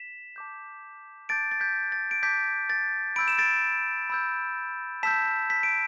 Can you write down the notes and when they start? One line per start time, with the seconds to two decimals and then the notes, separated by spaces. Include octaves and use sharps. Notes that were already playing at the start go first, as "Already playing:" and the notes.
Already playing: B6 E7
0.36 A5 D6 G6
1.29 A5 D6 G6 A6 D7
1.51 A6
1.60 G6 B6
1.92 A6
2.11 D7
2.23 A5 D6 G6 B6
2.70 A6
3.16 B5 E6 G6 D7
3.28 E7
3.38 A6 D7
4.10 B5 E6 G6
5.03 A5 E6 G6 B6 E7
5.50 B6
5.63 D7